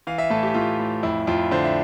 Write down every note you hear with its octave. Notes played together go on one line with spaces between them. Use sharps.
E3 F5
E5
A2 A4
G4
A2 F4
A2
F2 E4
F2 F4
D3 C5
E5